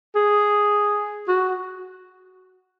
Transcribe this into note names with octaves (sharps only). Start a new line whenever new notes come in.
G#4
F#4